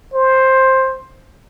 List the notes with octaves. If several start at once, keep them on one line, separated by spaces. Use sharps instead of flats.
C5